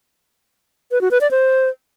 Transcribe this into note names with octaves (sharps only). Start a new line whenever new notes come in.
B4
F#4
B4
D5
C5